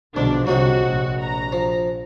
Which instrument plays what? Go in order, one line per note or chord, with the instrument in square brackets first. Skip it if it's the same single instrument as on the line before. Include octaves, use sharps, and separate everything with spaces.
[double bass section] B1 B2 F3 [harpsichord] G#2 D3 [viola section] D4
[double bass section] C2 C3 [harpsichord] F#3 G#3 C4 [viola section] F#4
[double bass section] A#1
[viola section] A#5
[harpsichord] F3